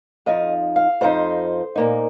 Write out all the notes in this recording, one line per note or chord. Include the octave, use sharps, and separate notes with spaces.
F2 F3 D#4 D#5
F5
F2 F3 D#4 C5
A#2 A#3 D#4